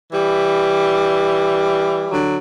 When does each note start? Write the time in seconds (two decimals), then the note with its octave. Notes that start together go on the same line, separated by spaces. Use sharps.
0.12 E3 G3
2.10 D3 F#3